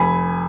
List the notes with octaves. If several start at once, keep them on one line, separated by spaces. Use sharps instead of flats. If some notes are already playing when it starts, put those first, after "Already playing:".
Already playing: F1 G#5 B5